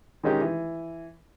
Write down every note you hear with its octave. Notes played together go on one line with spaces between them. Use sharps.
D#3 G#3 C#4 D#4 G4
E3